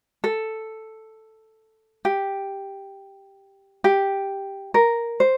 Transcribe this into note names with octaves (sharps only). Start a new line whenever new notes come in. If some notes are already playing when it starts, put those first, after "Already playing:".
A4
G4
G4
A#4
C5